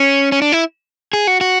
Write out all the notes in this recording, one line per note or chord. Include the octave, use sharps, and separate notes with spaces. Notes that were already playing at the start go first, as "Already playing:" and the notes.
Already playing: C#4
C#4
D4
E4
G#4
F#4
F#4